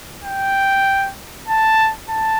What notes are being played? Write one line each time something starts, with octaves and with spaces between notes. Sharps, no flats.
G5
A5
A5